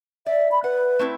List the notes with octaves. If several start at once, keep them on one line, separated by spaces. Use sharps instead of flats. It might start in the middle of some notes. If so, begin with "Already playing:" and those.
D5 E5
B5
B4 F#5
A3 C4 E4